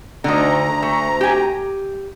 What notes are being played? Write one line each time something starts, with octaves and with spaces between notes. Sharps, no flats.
D2 D3 D#3 A#5
A3
G4 G#5